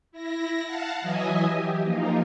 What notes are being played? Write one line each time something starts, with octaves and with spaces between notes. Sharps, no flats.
E4 A#6
F5 F#5 A5
E3 F#3 D#5 E5 G#5 D#6
G4
F3 A#3 D#4 F4 A#4